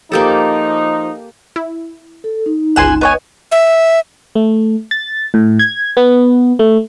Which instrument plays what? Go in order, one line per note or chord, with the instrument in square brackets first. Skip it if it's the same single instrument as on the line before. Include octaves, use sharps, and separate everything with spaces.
[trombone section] F3 D#4 [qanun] A#3 G4 A4
[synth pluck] E4
[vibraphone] A4
D#4
[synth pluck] G1 C#2 E7 [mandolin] F#5 G#5 C6
[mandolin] B3 C#5 G#5 [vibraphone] B4 D#5
[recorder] E5
[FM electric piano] A3
A6
A2
G#6
B3
A3